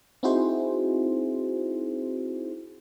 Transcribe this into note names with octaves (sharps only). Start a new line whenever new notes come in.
C4 D#4 E4 F#4 G#4 C5